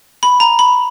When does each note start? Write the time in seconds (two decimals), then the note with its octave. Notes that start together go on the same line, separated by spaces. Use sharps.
0.23 B5
0.40 A#5
0.59 B5